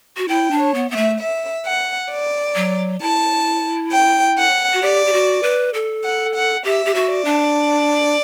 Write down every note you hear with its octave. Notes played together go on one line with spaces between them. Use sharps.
F#4
E4 G5
D4
C#5
B3
B3 E5
A3
E5
F#5
D5
F#3
E4 A5
G5
F#5
F#4
G4 D5
G4
F#4
B4
A4
F#5
F#5
G4 E5
G4
F#4
D5
D4